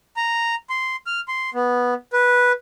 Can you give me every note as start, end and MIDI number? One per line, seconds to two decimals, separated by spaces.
0.17 0.55 82
0.69 0.96 84
1.07 1.20 89
1.28 1.50 84
1.54 1.94 59
2.13 2.52 71